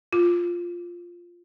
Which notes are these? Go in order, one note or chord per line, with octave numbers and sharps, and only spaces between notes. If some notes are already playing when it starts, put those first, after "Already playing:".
F4